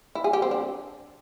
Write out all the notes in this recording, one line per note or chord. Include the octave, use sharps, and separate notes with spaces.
E4
G#4
G4
C4
D4